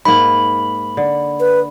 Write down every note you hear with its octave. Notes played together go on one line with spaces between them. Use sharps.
G#2 A#3 B5
D3
B4